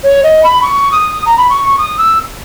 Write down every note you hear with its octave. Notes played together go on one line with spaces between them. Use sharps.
C#5
D#5
B5
C#6
D#6
A#5
B5
C#6
D#6
E6